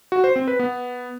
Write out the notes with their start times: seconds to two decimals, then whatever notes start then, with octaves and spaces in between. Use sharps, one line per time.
0.12 F#4
0.24 C5
0.36 C4
0.48 B4
0.59 B3